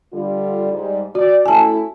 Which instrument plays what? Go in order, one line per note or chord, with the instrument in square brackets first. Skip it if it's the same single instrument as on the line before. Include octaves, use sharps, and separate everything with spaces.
[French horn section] D3 G3 F4
G#2 G3
[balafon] F#4 [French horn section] D5
[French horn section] A3 C#4 E4 [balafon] G#5 A5